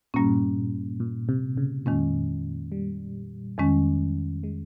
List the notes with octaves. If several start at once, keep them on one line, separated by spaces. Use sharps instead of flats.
G2 A#2 G3 A#3 C#4
A#2
C3
C#3
F2 A#2 D#3 G#3 C#4
G3
F2 D#3 G#3 C#4
G#3